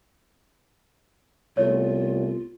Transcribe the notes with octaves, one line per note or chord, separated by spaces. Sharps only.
C2 A3 B3 F4 C#5